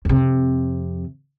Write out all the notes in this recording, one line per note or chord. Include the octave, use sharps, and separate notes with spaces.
F2 C3